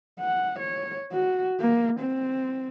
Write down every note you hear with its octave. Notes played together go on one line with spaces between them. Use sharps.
F#5
C#5
F#4
A#3
C4